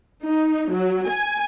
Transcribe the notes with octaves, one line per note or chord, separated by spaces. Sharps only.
D#4
F#3
G#5